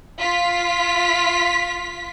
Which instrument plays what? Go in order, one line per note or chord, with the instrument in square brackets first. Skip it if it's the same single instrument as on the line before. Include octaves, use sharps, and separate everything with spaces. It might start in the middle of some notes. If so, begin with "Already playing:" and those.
[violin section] F4 B6